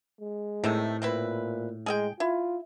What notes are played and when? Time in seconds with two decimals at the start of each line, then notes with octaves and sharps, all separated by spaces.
0.20 G#3
0.64 A2 C3 D#3 A3
1.02 A#2 C4 E4 B4
1.86 G#3 G#4 E5 G5
2.20 E4 F4